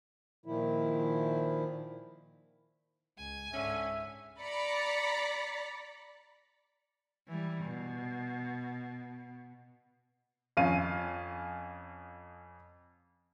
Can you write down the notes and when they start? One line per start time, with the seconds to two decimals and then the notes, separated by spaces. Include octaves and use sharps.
0.46 A#2 D#3 F3 E4
3.18 C#2 G#5
3.53 C#2 G#2 D3 C#4 E5
4.41 D5 A#5 B5 A6 B6 C#7
7.27 E3 G3
7.64 B2
10.57 F2 C#4 F5 D#7